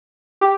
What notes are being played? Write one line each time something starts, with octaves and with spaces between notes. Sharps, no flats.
G4